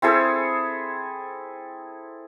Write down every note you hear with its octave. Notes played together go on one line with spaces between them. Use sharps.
C4 E4 G#4 A4